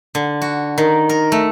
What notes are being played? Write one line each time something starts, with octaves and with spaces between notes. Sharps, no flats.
D3
F#4
D#3
A#4
A3